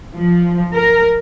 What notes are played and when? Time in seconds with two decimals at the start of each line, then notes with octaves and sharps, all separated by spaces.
0.15 F3
0.75 A#4